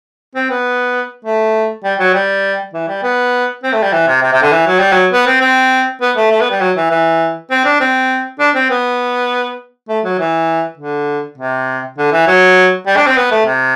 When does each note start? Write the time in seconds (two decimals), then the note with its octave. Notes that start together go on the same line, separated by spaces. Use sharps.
0.35 C4
0.50 B3
1.24 A3
1.84 G3
1.99 F#3
2.13 G3
2.73 E3
2.88 G3
3.03 B3
3.63 C4
3.72 A3
3.82 G3
3.92 E3
4.07 C3
4.22 C3
4.32 C3
4.42 D3
4.52 E3
4.67 F#3
4.79 G3
4.92 F#3
5.12 B3
5.26 C4
5.41 C4
6.01 B3
6.17 A3
6.31 A3
6.41 B3
6.51 G3
6.61 F#3
6.76 E3
6.90 E3
7.50 C4
7.65 D4
7.80 C4
8.39 D4
8.55 C4
8.70 B3
9.89 A3
10.04 F#3
10.19 E3
10.77 D3
11.37 C3
11.98 D3
12.12 E3
12.27 F#3
12.86 G3
12.96 D4
13.06 C4
13.17 B3
13.31 A3
13.46 C3